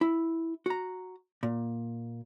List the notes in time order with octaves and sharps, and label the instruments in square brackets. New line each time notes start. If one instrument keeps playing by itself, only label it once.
[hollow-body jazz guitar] E4
F#4 A#5
A#2